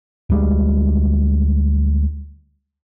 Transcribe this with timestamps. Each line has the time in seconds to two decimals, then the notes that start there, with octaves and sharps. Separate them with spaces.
0.30 D2 G3 G#3